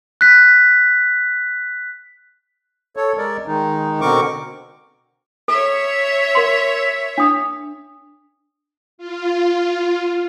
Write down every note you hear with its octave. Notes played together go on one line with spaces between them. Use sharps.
F#6 B6
A4 C#5
G#3 A#4 D5
D#3 G#3 D#4
B2 D3 C4 A#4 C#6 D6
A4 C#5 E5
A#4 C6
D4 D#6
F4